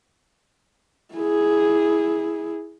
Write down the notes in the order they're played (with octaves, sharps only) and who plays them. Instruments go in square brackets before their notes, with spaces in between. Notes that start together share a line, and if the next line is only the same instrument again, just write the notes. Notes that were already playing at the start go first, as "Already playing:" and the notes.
[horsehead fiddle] E4 G#4